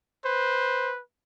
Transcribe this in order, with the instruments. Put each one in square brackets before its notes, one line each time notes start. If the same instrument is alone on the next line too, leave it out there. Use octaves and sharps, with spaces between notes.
[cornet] B4 [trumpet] C5